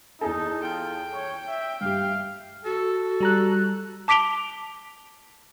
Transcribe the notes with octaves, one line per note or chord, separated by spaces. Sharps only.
E2 D#4 G#4 A4
F4 G5
C#5 C#6
E5
G2 G4 F5
F#4 A4
G3 A#5 F#6
A5 D6 B6 D7 F7 G7